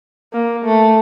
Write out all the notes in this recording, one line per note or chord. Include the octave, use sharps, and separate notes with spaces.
A#3
A3